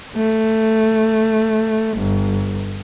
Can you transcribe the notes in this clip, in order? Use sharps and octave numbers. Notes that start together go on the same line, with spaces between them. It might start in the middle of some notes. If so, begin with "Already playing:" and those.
A3
G1